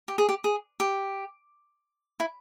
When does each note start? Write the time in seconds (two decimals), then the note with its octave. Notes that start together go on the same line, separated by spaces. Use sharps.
0.08 G4
0.18 G#4
0.29 G4
0.44 G#4
0.80 G4
2.20 E4